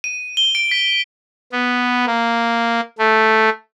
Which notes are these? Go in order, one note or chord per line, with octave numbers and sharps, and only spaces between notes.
D#7
G7
D7
B6
B3
A#3
A3